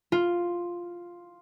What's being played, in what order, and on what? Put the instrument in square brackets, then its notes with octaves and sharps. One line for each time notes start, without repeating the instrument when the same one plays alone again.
[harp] F4